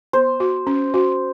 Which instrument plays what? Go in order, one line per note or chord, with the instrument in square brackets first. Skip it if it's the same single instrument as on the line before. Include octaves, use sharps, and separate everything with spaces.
[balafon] B3 [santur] C5
[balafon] F#4
C#4
F#4